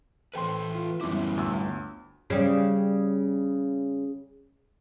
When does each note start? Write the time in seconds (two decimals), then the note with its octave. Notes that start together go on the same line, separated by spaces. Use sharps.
0.34 E3 A4 B4 C5 G5 C6
0.75 F4
1.01 F#2 E3 G3 B3 E4 D6
1.36 G1 D2 E6
2.30 C#3 G3